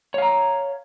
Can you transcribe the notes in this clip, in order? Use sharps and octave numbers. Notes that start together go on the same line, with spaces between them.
C#5 F5 A#5